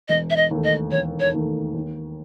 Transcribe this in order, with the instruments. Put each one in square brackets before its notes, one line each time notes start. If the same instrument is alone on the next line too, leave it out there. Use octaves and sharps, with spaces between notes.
[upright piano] E1 [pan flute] D#5
[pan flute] E5
D#5
[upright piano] D#2 D#3 A3
[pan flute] D#5
[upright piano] E1 [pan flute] C#5
[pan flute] C#5
[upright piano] D#2 D#3 A3
D#2